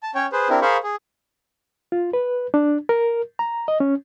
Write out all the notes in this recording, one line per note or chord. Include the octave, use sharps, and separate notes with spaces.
A5
C#4 C#5 G5
G#4 B4 C5
C4 D4 E4 G4 A#4
G#4 A#4 C5 F5 B5 C#6
G#4
F4
B4
D4
A#4
A#5
D#5
C#4